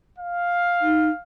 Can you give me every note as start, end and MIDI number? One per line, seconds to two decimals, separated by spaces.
0.18 1.22 77
0.81 1.09 63